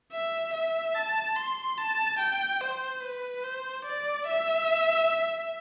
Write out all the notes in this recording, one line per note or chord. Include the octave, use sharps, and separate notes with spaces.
E5
E5
A5
C6
A5
G5
C5
B4
C5
D5
E5